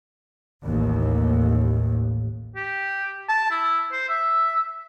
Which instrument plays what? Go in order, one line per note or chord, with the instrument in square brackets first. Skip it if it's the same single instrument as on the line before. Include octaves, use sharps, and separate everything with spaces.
[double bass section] A1 D#2
[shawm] G4
A5
E4
C5
E5